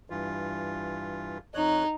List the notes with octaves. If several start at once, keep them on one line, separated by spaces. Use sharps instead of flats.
G2 E3 F4
F2 D#4 C#5 F#6